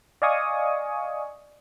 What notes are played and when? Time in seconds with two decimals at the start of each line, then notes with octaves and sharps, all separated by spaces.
0.22 D5 D#5 F5 G#5 C#6 D#6